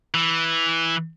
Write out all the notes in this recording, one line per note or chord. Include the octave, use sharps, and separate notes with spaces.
E3